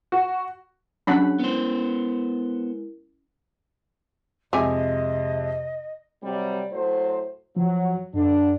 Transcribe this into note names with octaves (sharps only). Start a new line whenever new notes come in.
F#4
F#3 C#4 D4 F#4 G#4 F#5 B5
G#3 B3 E4 A#4 C5
F2 C3 G#3 G4 D#5 E5 G#5
C3 F#3 G3
A2 F#3 C5
F3 F#3
F#2 D3 D4